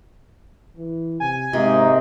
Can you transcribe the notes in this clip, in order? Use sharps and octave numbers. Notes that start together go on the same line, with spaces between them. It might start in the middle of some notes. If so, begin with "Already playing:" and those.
E3
C3 G#5
G#2 C3 A#3 D#4